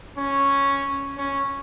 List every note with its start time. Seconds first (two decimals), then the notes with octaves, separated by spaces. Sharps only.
0.17 C#4
1.18 C#4